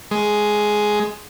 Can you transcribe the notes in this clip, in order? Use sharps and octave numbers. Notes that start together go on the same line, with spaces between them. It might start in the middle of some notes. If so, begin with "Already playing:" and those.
G#3